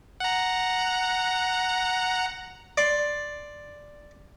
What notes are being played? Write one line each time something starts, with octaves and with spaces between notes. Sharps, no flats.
F#5 A#5
D5 C6